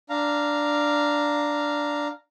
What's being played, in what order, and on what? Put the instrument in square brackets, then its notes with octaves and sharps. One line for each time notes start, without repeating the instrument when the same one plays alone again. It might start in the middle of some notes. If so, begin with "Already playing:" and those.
[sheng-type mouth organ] D4 F5 A#5